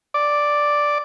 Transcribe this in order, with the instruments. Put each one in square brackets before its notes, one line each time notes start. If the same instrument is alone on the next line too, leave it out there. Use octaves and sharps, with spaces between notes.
[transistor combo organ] D5